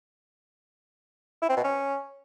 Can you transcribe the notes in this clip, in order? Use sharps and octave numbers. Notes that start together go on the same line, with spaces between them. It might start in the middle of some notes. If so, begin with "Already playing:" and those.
E4
C4
B2
C#4